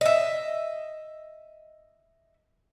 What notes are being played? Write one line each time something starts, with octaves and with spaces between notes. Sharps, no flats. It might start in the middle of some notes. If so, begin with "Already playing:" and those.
D#5 E5